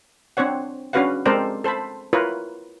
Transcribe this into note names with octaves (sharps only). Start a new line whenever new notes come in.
C4 D4 C5 C#5 F#5
C#4 D4 F#4 B4 F5 F#5
G#3 C4 A4 A#4 C5 D5
A4 C5 A5 B5
E4 F4 A#4 B4 C#5